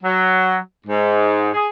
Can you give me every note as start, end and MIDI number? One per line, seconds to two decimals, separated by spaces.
0.03 0.57 54
0.87 1.49 44
1.54 1.68 68